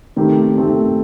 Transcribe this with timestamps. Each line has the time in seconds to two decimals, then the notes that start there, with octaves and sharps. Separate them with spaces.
0.16 D#3 A3 C4 G4
0.57 D#3 A3 C4 G4